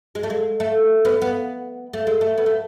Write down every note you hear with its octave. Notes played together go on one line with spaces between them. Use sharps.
G#3
A3
G#3
A3
B3
B3
A3
G#3
A3
B3
A3